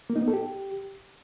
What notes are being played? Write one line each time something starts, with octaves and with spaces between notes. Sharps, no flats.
A#3
D#4
B3
A4
G4